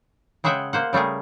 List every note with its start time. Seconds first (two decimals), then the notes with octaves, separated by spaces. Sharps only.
0.44 C#3 G#3 G#4 E5 F#5 G5
0.73 A#3 C5 F#5
0.93 C#3 G3 A3 G#4 A#4